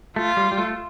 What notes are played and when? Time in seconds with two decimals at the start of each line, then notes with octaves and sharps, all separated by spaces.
0.16 A3 F4
0.37 G3
0.51 G3
0.58 A3